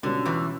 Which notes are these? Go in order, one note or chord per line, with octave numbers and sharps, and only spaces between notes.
C#2 B2 D3 G3 C#4
E2 E3